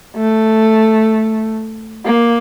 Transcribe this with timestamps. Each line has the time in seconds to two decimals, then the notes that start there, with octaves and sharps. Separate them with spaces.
0.17 A3
2.05 A#3